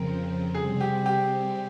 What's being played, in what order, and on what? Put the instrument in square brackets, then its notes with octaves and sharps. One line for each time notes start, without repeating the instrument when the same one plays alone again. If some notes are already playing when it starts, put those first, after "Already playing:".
Already playing: [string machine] F2 C#3 F3 C4 [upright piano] A#4
[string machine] C3 G3 C4 [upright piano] G#4
[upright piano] G4
G4